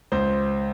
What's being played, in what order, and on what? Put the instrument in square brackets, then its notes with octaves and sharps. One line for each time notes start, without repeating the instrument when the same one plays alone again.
[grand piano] C#2 C5